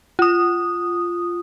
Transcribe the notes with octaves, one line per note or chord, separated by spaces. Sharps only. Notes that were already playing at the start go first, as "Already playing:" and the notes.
F4 D#6